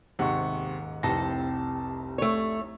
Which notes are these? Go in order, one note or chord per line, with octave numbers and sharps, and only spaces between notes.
D#1 G#2 C3 F#5 C#6
F1 C2 C3 A5 A#6
A3 C#5